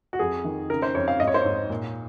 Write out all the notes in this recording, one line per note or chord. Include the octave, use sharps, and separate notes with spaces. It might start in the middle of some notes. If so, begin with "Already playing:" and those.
F#4
F2 G#4
D#3
C#3 A#4
C5
F2 C#5
F5
G#2 D#5
C#5
C5
G#2 C#5
A#2